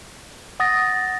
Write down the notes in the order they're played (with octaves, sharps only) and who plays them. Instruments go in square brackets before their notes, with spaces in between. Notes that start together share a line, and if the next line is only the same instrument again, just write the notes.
[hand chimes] F#5 D#6 A6 A#6